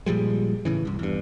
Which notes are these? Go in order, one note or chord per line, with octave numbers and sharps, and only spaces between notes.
A#2 F3 G3 G#3
A2 C#3 E3
C2 G2
E2 G2